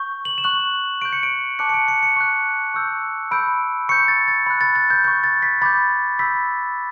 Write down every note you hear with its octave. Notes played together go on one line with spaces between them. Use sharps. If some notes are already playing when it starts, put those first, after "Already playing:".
Already playing: C#6 G6
F#7
E7
C#6 F#6 F#7
C#6 G6 D7
C#7
D7
A5 D6 F#6 C#7
C#7
D7
C#7
C#7
C#6 F#6
C#6 E6 G6
B5 E6 G6 D7
C#6 G6 C#7
A6
A6
B5 F#6
A6
A6
G6
C#6 G6
A6
B6
B5 D6 G6 A6
B5 E6 G6 B6